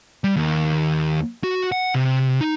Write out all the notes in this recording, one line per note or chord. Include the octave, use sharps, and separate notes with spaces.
G3
D#2
F#4
F#5
C3
D#4